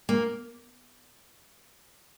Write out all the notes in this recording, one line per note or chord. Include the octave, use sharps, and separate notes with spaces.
A#3